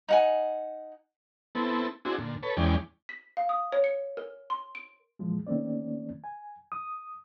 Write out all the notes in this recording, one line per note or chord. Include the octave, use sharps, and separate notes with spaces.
D#4 F#5 G#5
B3 C4 E4 A4
C4 D4 E4 F#4 G#4
A#2 D3
A4 B4 C#5
E2 E3 G#3 C#4 D5 G5
B6
F5
D#6
C#5
C#7
A#4
C6
D7
A#2 E3 F3 G#3
D#3 A3 A#3 C4 C#4 D5
G#5
D#6